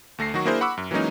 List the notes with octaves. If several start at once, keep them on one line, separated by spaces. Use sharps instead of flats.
D2 A3 A#6 C7
D#3 F#3 F#4 C#6
A#3 D4 E4 G#4 A#4 C5
F#5 B5 C#6 D6 E6
F#2
E3 F#3 G#3 A#3 C#4 D#4